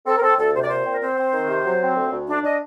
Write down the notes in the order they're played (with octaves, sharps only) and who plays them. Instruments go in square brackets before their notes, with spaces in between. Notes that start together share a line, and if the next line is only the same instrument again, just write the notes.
[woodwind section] C4 A4
A#4
C4 A4
D2 A4
C3 C5
D5
A#2 C5
C4
A#4
C4 C5
C4
D#3
C3
F#3
C4
D2
D2
D4
D4 D#5